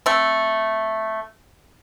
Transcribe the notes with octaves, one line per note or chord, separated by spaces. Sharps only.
A3 C4